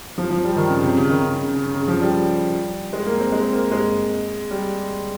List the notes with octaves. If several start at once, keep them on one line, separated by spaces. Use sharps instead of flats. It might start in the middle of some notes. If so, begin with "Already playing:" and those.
F3
F3
G3
D#3
C#3
C3
C#3
D#3
C#3
C#3
C#3
C#3
F3
G3
G#3
A#3
C4
G#3
C4
A#3
G#3
G3